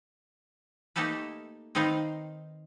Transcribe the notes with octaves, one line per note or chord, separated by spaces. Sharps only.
A3 A#3 D#4 G4 A4 B4
D#3 C4 D#4 B4 F5